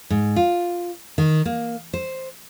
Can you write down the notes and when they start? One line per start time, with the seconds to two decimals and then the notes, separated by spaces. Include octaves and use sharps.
0.10 G#2
0.36 F4
1.18 D#3
1.45 A#3
1.94 C5